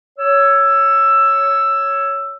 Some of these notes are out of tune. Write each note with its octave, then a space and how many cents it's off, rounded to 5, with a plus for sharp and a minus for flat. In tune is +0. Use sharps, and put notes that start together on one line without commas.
C#5 +0 E6 +10